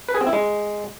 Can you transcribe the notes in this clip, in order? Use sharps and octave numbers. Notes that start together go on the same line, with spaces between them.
B4
G#4
C4
E4
G#3